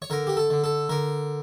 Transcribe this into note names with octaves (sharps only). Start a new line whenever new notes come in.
C#5
D3 A#4
G4
A4
D3
A4
D3 A#4